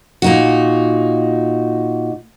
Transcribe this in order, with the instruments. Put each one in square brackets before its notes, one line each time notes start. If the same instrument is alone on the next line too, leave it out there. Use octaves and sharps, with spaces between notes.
[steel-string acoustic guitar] A#2 D#4 F#4